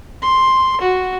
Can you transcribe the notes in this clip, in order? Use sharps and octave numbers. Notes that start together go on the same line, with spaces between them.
C6
F#4